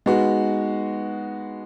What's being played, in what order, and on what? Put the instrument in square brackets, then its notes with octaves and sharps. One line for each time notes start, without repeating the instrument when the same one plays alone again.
[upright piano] G#3 B3 D#4 F#4